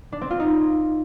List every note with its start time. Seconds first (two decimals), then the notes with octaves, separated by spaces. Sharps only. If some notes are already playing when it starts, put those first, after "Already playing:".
0.12 D4
0.21 C4
0.30 F4
0.40 D#4